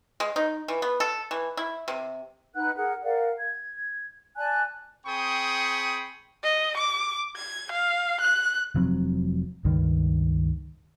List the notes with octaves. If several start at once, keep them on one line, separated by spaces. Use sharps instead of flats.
G#3
D#4
E3
B3
A4
E3
E4
C3
D#4 B4 F#5 F#6
G#4 A#4 F#5
A#4 D5 F5 F#5
G#6
D5 G#5 A5 F#6
C4 G#4 G5 B5 C#6 D#6
D#5
D6
G#6
F5
F#6
F1 F3 F#3 C4
C#2 G2 D#3